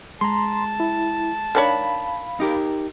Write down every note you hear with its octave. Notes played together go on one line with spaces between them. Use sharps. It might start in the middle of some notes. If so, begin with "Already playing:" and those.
G#3 A5 A#5 C6
E4
D#3 D4 C#5 F5 B5
D#4 G4 A#4